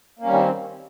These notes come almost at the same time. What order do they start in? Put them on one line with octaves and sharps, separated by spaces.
A#3 C#4 G3 D#3 C4